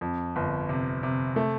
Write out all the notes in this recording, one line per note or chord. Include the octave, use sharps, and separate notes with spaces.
F2
G1
C3
C3
A3